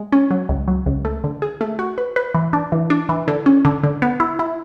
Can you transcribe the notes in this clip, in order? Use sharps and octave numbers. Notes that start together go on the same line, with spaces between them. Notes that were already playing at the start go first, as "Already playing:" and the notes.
Already playing: G#3
C#4
F#3
C#2
F#3
C#2
A3
D3
G#4
A3
F#4
B4
B4
E3
D4
E3
D4
E3
D3
C#4
D3
D3
B3
E4
E4